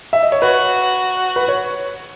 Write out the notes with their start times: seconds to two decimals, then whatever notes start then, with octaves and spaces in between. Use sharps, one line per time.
0.13 E5
0.23 D#5
0.32 C#5
0.42 F#4 B4
1.36 B4
1.48 C#5